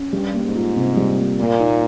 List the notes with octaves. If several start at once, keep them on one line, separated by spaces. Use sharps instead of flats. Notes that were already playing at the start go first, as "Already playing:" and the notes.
Already playing: C#4
G2 G3
A#3
G#2
F4
C3
G3
A#3
A#2 A#3
D#4